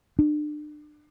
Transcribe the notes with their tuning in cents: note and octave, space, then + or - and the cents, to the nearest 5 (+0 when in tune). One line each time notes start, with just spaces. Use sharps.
D4 +35